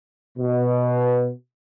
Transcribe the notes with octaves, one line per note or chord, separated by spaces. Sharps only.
B2